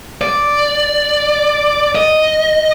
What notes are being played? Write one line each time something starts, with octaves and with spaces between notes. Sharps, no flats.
D5
D#5